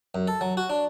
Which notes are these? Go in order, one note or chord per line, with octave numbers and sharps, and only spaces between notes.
F#2
A4
F#3
F#4
D4